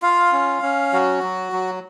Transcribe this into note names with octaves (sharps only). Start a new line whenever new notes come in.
F4 F5
C#4
C#4
F#3 F#4
F#3
F#3